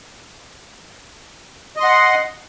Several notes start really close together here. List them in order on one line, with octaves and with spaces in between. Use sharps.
D#5 C6 F#5